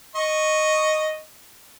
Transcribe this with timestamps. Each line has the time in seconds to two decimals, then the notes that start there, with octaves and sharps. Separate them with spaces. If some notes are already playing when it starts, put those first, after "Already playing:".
0.15 D#5 C#6